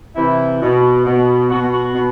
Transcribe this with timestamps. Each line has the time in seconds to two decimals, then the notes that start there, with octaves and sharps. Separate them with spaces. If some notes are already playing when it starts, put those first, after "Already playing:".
0.16 C3 E3 E4
0.62 B2
1.05 B2
1.50 B2 F#4
1.73 F#4
1.95 B2